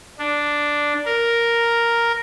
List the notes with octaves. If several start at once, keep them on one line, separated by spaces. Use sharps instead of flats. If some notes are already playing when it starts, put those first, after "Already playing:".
D4
A#4